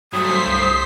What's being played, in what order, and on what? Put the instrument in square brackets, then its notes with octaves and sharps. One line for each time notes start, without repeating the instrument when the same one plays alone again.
[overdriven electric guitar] G2 A3 [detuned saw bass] F#3 [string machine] C5 B6 C7 [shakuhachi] D#6
[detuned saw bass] C2